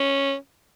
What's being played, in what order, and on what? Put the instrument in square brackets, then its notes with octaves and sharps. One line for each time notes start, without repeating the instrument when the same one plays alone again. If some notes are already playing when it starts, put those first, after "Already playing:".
Already playing: [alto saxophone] C#4